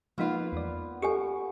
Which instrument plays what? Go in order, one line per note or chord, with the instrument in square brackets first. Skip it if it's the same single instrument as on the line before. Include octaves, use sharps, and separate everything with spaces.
[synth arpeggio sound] F3 G#3 D#4 [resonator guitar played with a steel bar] A#3 F4 [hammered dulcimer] B3 B4
[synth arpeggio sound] E2 D5
[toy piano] G4 A4 G#5 [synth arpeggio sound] C#6